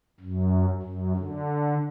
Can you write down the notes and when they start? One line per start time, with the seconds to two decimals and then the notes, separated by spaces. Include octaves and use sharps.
0.20 F#2
0.83 F#2
1.16 D3